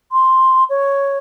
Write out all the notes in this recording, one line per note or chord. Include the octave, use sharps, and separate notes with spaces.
C6
C#5